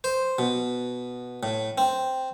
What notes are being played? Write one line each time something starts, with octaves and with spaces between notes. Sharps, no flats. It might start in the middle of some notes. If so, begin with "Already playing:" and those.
C5
B2
A2
C4